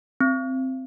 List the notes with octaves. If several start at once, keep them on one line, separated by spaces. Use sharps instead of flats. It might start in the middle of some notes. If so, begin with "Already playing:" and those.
C4